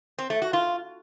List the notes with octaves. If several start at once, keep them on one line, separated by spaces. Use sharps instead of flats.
C4
A3
F#4
F4